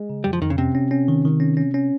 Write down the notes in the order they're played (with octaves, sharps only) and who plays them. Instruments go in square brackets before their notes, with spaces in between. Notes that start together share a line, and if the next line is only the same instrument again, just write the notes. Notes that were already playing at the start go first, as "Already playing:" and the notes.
Already playing: [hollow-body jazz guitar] G#3
[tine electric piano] C#3
[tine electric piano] F2 [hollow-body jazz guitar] G3
[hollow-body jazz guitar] F3
[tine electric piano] F2 [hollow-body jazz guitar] D#3
[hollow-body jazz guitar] C#3
[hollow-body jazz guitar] C3 [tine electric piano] C#4
[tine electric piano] C#4
C#4
D#3
D#3
C#4
C#4
C#4